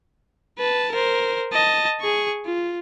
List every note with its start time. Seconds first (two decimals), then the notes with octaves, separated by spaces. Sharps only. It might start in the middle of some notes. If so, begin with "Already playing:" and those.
0.58 B4 A5
0.92 A#4 C5
1.52 D#5 A5
2.01 G#4 C#6
2.45 F4